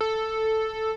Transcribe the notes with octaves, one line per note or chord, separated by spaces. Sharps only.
A4